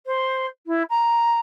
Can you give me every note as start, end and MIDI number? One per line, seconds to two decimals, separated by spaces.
0.06 0.45 72
0.66 0.82 64
0.89 1.39 82